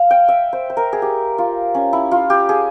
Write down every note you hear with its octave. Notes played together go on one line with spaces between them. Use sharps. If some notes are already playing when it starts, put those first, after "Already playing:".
Already playing: F5
G5
E5
C5
C5
A#4
G#4
G4
F4
C#4
E4
F4
G4
G#4